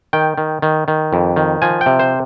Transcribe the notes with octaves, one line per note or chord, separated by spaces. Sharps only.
D#3 G5
D#3
D#3
D#3
F2
D#3
F3 G#5
G5
C3
C5